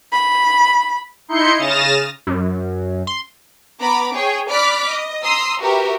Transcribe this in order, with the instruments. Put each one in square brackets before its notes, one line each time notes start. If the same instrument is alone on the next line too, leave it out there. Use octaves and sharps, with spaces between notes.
[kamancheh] B5
[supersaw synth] D#4 E4 C6 G6 C#7
C#3 D#6 F6 A6 A#6 E7
[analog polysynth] F#2
C6
[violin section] B3 A#5 B5 D6
G#4 C#5 G5
D5 B5 D6 F6 F#6 B6
D#5
A#5 C6 D#6 E6
F#4 G4 A#4 B4 E5